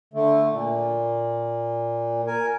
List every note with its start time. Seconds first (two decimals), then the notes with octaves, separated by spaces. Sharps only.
0.14 D3 A3
0.51 A#2
2.27 A#4 G#5